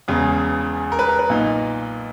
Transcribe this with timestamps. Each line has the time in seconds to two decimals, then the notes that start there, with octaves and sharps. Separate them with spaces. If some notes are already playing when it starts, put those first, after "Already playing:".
0.08 E1 E2 C#3
0.92 A#4
0.99 B4
1.09 A#4
1.19 B4
1.29 B1 A#2 A#3 D#4